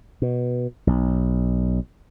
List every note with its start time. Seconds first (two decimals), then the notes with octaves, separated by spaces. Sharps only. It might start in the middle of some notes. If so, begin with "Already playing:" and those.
0.22 B2
0.87 B1